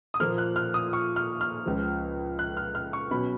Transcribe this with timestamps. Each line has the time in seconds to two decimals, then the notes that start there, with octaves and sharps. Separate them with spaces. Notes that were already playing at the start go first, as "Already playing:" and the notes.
0.14 D#6
0.20 A#2 F3 A#3 F6
0.38 F#6
0.56 F6
0.74 D#6
0.93 C#6
1.16 F6
1.41 F6
1.66 C#2 C#3 F3
2.39 F#6
2.57 F6
2.75 F6
2.93 C#6
3.11 B2 F#3 C#4 B5